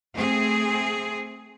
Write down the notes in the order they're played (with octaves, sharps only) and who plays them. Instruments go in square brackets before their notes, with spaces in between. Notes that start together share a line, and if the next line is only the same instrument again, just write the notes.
[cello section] A3 C4 G#4